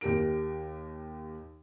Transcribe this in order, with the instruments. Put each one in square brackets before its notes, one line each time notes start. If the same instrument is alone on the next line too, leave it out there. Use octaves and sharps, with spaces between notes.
[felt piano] D#2 G4 A#4 D7